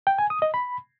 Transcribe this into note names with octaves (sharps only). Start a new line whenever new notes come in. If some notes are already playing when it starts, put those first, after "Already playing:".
G5
G#5
D#6
D#5
B5